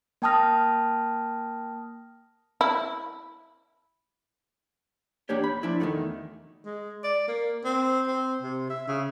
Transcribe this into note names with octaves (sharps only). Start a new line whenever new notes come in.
A#3 G5 A5 D#6 F6 A#6
E4
E2 A#3 D4 G4 C#5
B5
F3 D4 E4
E2 D#3 E3 F#3 A3
G#3
D5
A#3
C4
C4
C3
E5
C#3